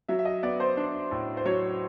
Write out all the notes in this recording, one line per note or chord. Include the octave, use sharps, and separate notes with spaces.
F#3 E5
E5
D#5
B3 D5
C5
D4
A2
C5
F#3 C#5